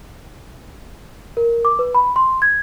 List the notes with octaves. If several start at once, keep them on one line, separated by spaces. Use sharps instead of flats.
A#4
D6
B4
B5
C6
G#6